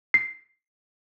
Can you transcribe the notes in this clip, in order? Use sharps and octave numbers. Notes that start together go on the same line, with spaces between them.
C7